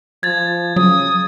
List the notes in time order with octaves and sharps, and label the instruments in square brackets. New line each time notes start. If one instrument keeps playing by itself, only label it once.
[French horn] F3 [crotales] G#6 A6
[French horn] C#3 [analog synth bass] F#3 [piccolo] D#6